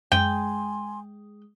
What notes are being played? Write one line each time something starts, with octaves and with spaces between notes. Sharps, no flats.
F#2 G#3 G5 G#5 C6 D7 D#7